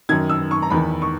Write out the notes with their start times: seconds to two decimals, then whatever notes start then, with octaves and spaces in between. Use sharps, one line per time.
0.09 F#2 D#3 G#6
0.29 E6
0.51 C#6
0.62 A#5
0.70 E2 D#3 B5
1.02 C#6